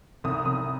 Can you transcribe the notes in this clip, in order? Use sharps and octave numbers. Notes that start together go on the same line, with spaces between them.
C2 D#6
C2 D#6